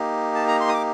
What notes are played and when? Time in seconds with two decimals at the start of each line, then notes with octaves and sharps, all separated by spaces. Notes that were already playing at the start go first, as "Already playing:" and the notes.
Already playing: A#3 D#4 G4
0.35 A5
0.48 A#5
0.60 C6
0.69 D#6
0.73 D6